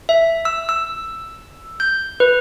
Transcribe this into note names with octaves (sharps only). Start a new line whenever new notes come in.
E5
E6
E6
G6
B4